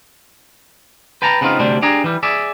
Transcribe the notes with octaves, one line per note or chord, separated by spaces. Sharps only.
B4 G5 A5 A#5
C#3 B3 C4 D#4 F4
D2 C3 G3 D4 C5
D4 G4 G#4 A#5
E3 G3
G#4 D5 E5